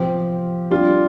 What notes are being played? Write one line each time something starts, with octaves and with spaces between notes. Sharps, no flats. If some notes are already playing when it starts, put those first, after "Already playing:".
Already playing: C3 F3 C4 G4
G3 D4 F4